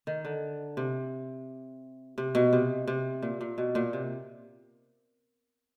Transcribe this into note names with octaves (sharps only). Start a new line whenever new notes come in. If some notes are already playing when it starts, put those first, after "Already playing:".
D#3
D3
C3
C3
B2
C3
C3
A#2
A#2
B2
A#2
C3